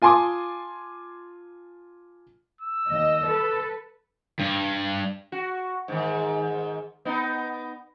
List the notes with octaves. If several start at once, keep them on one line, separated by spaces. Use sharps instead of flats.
F4 G#5 A5 C6 D6 D#6
E6
D#2 D#5
A4 B4
G2
F#4
G#2 D#3
B3 D#4